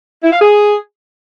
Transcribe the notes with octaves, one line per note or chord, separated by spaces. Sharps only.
E4
F5
G#4